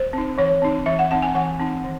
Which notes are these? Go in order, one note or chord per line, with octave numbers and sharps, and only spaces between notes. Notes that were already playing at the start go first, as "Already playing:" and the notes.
Already playing: C5
C4 D#4
E3 C#5
C4 D#4
E3 E5
F#5
C4 D#4 F#5
G#5
E3 F#5
C4 D#4
D#3